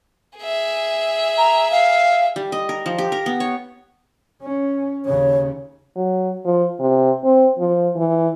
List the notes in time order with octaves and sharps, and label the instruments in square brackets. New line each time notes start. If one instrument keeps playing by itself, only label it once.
[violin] G#4 E5
[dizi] A#5
F5
[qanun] G3
D#5
A#4
F3
G4
A#4
B3
C#5
[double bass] C#4
[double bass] D#2 C#3 [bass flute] C#5
[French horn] F#3
F3
C3
C4
F3
E3